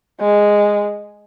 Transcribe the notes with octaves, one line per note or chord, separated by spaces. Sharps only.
G#3